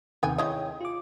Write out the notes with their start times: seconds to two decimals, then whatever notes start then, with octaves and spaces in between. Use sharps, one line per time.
0.23 D#2 C3 D#3 B3 G5 G#5
0.38 G#3 E4 C#5 D#5 G5
0.81 F4 D6